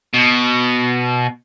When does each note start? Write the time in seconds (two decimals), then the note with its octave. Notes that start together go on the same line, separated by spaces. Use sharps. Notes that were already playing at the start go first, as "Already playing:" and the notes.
0.14 B2